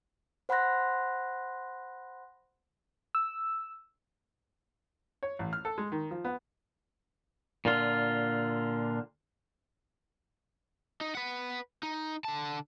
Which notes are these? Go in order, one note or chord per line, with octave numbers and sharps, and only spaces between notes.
C5 F#5 B5 C6 F#6 A#6
E6
C#5
A1
F6
A4
G#3
D#3
F3
B3
A#2 D3 F4
D#4
B4 F#5
D#4
D3 A5